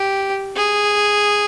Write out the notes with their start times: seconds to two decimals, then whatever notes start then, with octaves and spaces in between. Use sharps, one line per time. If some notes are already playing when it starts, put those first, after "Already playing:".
Already playing: G4
0.56 G#4